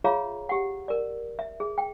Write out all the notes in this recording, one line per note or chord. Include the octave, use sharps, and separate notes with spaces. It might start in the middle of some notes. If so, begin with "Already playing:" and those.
F4 G#4 C#5 E5 F5 A#5
G4 F#5
A#4 D5
E5
G#4
G5